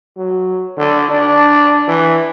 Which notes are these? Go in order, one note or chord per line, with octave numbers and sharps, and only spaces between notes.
F#3
D3
D4
E3